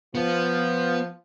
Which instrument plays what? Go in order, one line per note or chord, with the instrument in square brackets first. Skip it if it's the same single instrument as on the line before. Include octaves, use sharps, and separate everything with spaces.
[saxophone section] F3 [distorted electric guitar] B3